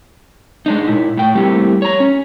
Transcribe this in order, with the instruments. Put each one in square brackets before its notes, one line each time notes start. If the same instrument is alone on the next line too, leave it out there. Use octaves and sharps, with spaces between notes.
[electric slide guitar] G#3 D4 D#4
A#2 E4
A2 G5
G3 A3 A#3 C4 E4 G4
C#5 A#5
C#4